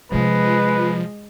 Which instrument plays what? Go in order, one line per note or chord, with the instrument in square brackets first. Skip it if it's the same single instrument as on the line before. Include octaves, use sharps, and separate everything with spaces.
[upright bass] C3 C#4 [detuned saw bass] F3 [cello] G#3 [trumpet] B4